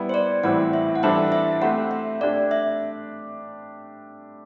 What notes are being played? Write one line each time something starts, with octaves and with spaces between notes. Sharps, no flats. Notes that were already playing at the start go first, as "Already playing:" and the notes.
Already playing: G3 B3 E4
C5
D5
A2 E3 G3 C4 E4 F#5
E5
F#5
E3 G3 D4 A4 C5 E5
E5
A3 C4 G4 C5 F#5
E5
A3 D4 G4 D5
E5